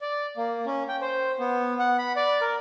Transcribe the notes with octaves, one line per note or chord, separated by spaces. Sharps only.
D5
A#3
C#4
G5
C5
B3
F#5
B5
D5
A#4